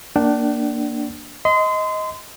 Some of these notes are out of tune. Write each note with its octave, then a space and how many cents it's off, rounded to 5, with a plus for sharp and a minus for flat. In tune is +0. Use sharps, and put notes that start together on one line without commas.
A#3 +0 D4 +0 G5 -45
D#5 +15 C6 -30